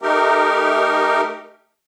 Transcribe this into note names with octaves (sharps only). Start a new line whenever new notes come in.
A3 D#4 G4 A#4